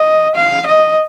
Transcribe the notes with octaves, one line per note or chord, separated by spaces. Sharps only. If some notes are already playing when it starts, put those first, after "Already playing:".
Already playing: D#5
F5
D#5